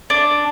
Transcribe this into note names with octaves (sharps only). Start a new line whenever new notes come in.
D4